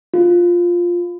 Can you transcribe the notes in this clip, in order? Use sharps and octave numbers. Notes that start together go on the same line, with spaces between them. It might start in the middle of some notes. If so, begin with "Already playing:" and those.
F4